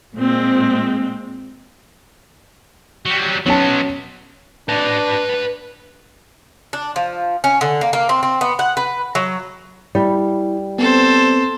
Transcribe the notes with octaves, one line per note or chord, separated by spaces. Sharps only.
A#2 G#3 C4
F#3 G3
F#3 B3 C#4 A5
D4 B4 A5
D4
F3
C#4
D3
A#3
A#3
C4
C4
B3
F#5
B4
F#3
G3 E4
B3 C4 A4 C5